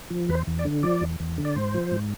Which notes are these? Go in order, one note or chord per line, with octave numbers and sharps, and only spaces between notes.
F3
E2 B4
C5
E2
D5
D3
F3 D5
E2
E2
D3
D5
G#2 C5
F3
G#2